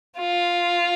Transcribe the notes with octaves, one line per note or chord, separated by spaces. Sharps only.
F4